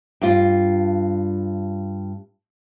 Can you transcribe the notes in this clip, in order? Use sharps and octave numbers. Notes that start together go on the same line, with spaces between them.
G2 F4